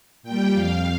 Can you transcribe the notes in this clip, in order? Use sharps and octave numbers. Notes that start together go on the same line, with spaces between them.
A#2 G3 G5
F2 F3 F5